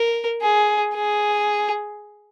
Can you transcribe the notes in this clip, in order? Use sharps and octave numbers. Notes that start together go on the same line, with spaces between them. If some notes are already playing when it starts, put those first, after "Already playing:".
Already playing: A#4
G#4
G#4